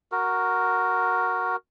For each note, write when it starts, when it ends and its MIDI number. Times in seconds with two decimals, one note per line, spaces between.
0.12 1.56 66
0.12 1.56 70